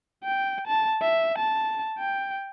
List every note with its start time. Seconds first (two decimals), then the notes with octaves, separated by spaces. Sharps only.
0.24 G5
0.67 A5
1.01 E5
1.38 A5
1.99 G5